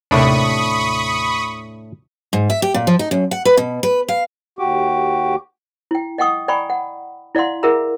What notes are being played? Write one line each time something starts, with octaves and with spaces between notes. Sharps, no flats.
D#2 A2 C3 D4 B5 C#6 D#6
G#2
E5
G4
A#2
F3
D#4
F#2
F#5
B4
B2
B4
F5
D#2 F#4 G4 D6
E4 G5
D#5 F#5 G5 C#6 D#6
D5 G5 G#5 A#5 B5 C#6
F#5
E4 D5 F5 F#5 C6
E4 G#4 A#4 E5 F#5 A#5